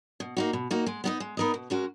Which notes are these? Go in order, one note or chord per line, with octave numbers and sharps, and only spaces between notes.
B2
A#3 D#4 F#4
B2
A#3 D#4 F#4
G#3
B3 D#4 A#4 D#5
G#3
B3 D#4 A#4 D#5
B2
G#3 C#4 F#4 A#4